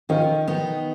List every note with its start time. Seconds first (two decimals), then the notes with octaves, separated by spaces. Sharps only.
0.09 D#3 C#4 F4
0.47 D#3 B3 D#4